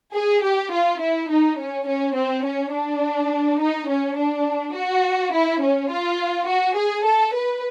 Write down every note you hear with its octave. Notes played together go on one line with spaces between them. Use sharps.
G#4
G4
F4
E4
D#4
C#4
C#4
C4
C#4
D4
D#4
C#4
D4
F#4
E4
C#4
F4
F#4
G#4
A4
B4